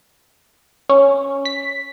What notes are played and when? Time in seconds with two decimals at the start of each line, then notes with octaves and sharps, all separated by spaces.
0.89 C#4
1.45 B6